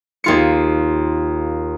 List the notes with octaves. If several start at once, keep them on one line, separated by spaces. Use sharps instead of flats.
D#2 F4 C#7